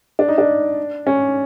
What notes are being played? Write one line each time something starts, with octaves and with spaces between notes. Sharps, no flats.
D4
D#4
D4
C#4